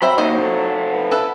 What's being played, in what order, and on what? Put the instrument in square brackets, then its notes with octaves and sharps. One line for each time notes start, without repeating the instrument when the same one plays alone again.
[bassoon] F#3 [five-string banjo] C4 C5 E5 [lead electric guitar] B5
[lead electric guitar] A#3 D#4 [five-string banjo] E4 C5 D#5
[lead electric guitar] C3 A4
[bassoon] B3
[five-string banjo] E4 A4 B4